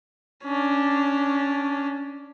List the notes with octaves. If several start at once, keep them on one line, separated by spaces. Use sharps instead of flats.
C#4 D4